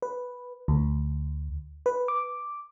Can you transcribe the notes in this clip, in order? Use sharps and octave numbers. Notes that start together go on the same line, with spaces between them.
B4
D2
B4
D6